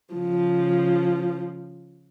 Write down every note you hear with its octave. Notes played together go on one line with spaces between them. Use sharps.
C#3 F3